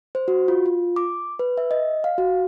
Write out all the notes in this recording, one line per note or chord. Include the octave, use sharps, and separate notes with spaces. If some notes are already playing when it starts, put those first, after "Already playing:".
C5
F#4
F4
F4
D6
B4
E5
D#5
F5
F#4